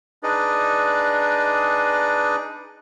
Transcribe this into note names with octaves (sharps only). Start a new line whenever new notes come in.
D4 D#4 G#4 B4 D5 D#5